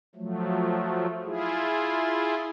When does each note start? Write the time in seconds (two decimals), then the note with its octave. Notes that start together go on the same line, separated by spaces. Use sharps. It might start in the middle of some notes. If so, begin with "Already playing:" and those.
0.15 F3 F#3 A3
1.25 E4 F4 G#4